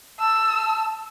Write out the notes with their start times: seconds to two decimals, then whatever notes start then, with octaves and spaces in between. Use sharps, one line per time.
0.19 A5 E6